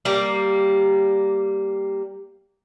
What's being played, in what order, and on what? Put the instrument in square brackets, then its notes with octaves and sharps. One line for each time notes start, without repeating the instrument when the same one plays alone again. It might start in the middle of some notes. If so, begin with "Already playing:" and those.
[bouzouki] G3 A#3